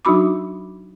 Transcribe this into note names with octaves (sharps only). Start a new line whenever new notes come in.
F#3 D4 D#4 F#4 B5 D6